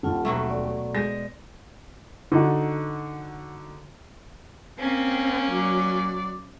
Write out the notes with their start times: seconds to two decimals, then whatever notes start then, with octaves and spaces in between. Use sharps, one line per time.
0.03 D#1 D#2 F4 F#5 A5
0.25 B2 F#3 A3 E5
0.50 D5
0.95 G#3 G6 A#6
2.32 D3 D#4 F#4
4.79 A#3 C4 C#4
5.51 F#3 D5